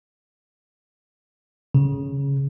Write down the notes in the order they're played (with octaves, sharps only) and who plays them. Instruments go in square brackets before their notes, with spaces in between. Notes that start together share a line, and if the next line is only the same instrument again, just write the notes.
[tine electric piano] C#3